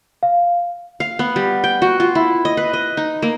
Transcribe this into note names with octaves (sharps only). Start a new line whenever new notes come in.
F5
F5
B3
G3
G5
F#4
F4
E4
D#5
B4
D#5
D#4
A#3